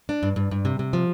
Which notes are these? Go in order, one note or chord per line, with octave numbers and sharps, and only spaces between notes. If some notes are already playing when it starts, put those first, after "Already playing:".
D4
G2
G2
G2
C3
C3
F3